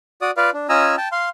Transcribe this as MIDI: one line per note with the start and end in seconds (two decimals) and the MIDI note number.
0.22 0.31 66
0.22 0.31 74
0.22 0.31 87
0.37 0.50 65
0.37 0.50 71
0.37 0.50 74
0.37 0.50 77
0.54 0.67 62
0.69 0.96 61
0.69 0.96 65
0.69 0.96 75
0.69 0.96 80
0.69 0.96 82
0.69 0.96 88
0.97 1.09 79
0.97 1.09 81
1.12 1.29 77
1.12 1.29 84